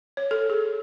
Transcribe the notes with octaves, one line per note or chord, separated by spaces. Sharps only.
C#5
A4
G#4